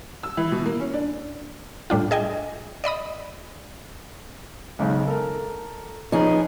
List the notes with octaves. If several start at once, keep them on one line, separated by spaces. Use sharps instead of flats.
E6
E3
B2
A#3
C#4
D4
A2 G3 D4 F4
G#4 D#5 G5 G#5
D5 D#5 B5 D#6
B1 G#2 C#3
A4 A#4
F3 C#4 D#4 G#4 B4